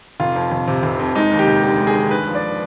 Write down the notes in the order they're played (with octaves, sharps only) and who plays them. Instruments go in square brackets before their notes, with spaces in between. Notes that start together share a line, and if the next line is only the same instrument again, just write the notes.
[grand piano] F1 F4
F2
F1
C3
F1
F2
G#3 D#4
D#2
G4
F1
D3 G4
G#3
G#4
D#2
G2 B4
F3
D5